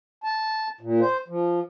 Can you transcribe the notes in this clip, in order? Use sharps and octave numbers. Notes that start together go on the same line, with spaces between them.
A5
A#2
C5
F3